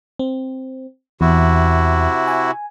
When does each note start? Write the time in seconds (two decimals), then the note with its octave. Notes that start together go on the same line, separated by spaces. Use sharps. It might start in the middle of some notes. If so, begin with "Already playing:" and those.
0.19 C4
1.21 E2 C3 E4 F#4
2.27 G#5